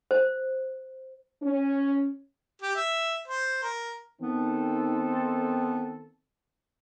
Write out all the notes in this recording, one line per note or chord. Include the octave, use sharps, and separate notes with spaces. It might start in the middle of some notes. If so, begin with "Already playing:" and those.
C5
C#4
G4
E5
C5
A#4
D#3 B3 C4 A4